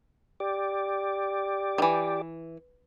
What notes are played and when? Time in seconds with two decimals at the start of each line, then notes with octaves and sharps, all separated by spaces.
0.40 G4 D5
1.78 D#3 E3